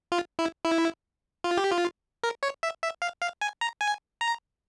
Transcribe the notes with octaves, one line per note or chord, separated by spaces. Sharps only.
F4
E4
E4
F4
G4
F4
A#4
C#5
E5
E5
F5
F5
G#5
A#5
G#5
A#5